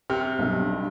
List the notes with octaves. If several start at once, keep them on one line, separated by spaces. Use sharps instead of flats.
C3 F6
B1 G2